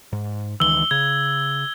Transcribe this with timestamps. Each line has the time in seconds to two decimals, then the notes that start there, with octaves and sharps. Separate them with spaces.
0.13 G#2
0.60 C#2 D#3 E3 E6 G7
0.91 C#3 G#6